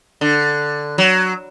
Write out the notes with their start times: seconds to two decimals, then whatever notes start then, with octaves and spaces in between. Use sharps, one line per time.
0.21 D3
0.98 F#3